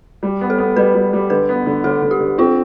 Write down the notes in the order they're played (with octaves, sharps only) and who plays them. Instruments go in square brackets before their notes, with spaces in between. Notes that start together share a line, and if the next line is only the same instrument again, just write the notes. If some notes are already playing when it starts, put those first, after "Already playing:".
[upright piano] G3
B3
[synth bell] A4
[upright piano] B3
[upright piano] G3 [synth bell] B4
[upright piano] G3
G3
[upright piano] D3 [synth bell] B4
[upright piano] B3
D3
[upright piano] D3 [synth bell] A4
[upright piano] D3
[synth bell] G4
[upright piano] D3
[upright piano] C4 [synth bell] F4